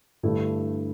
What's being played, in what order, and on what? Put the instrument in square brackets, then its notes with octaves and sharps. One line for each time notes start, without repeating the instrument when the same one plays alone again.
[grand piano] G2 D3 A3 E4 G4